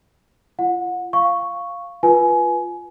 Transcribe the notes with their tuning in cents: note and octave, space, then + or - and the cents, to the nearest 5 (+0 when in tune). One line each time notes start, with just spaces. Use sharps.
F4 -35 F#5 -30
F5 +0 C#6 +0
F4 +0 B4 -20 G#5 +20